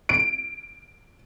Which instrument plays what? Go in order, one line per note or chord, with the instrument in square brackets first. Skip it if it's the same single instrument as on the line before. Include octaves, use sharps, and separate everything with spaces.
[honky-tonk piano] D7